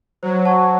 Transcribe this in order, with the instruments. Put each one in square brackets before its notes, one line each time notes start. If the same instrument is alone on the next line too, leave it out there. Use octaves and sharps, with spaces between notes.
[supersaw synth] F#3 [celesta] C5
[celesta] F#5 A5 C#6